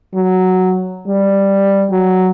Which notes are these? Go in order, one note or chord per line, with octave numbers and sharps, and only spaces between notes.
F#3
G3
F#3